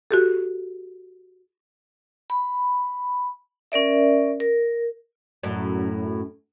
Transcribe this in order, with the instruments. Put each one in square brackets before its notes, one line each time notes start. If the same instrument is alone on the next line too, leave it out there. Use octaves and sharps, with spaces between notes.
[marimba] F#4 G4 A4
[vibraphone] B5
C#4 A#4 D5 E5
A#4
[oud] F#2 A2